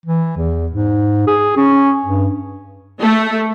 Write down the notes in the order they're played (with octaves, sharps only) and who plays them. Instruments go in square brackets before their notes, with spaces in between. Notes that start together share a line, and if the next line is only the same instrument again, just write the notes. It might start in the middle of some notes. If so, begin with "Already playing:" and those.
[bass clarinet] E3
E2
G#2
G#4
C#4
G2
[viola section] A3